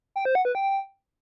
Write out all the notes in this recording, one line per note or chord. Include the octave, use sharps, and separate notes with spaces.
G5
C5
F#5
B4
G5